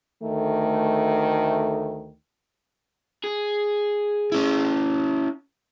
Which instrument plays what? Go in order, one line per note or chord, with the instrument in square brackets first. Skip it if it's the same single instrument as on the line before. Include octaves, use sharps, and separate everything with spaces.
[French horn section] D2 D#3 A3
[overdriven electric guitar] G#4
[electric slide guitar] C#4 E4